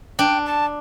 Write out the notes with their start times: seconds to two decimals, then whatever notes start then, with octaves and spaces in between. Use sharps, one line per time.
0.19 D4 G5
0.46 A5